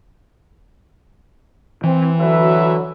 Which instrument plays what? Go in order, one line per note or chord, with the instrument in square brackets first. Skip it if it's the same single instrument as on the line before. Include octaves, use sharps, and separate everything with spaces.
[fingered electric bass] E3 [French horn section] C4
[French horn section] D3 F#3 [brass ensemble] F#4 B4 E5